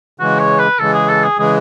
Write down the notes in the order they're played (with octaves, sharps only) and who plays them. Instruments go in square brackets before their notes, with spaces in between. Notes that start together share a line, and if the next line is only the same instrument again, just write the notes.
[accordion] C#3 E3 G#3 [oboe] F#4
[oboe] C#5
B4
[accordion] C#3 E3 G#3 [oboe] A4
[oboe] G#4
A4
G#4
[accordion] C#3 E3 G#3 [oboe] G#4